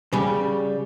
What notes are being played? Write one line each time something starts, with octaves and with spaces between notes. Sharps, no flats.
C#3 G3